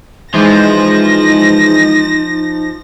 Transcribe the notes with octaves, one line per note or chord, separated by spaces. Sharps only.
E3 F3 G#3 D#4 C5 A#6